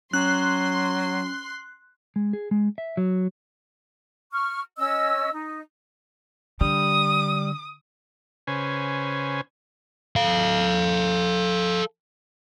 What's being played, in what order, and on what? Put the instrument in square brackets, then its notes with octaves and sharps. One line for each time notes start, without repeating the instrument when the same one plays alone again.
[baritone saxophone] F#3 [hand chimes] C#4 [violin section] C6 [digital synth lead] F#6
[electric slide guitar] G#3
G#4
G#3
E5
F#3
[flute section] C#6 F6
C#4 D#5 E6
D#4
[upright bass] D3 [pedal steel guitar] G3 [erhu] D#6
[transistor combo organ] C#3 C#4 B4 C5 G#5
[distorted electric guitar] A4 F5